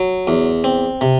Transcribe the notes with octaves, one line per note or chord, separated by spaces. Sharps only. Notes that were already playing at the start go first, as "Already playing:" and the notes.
Already playing: F#3
E2
C4
C3